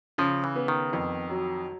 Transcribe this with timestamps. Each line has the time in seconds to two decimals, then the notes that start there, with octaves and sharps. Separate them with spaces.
0.18 C#3 F3
0.44 E3
0.55 B3
0.68 D#3
0.93 F2
1.30 F#3